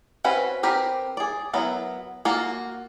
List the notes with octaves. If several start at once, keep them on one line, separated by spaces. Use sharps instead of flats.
C4 C#4 F#4 B4
C4 G4 A#4 B4
G#4 D5
F#3 B3 E4 A#4
A#3 F4 F#4